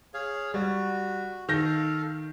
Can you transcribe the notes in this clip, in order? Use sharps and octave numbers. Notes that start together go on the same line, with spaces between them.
G#4 C#5 F5
G3 F#4
D#3 A4 F5 G6 A#6